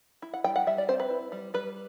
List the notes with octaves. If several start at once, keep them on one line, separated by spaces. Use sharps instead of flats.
E4
F#5
G3 G5
F#5
G3 E5
D5
C4 C5
B4
E4
G3
G3 B4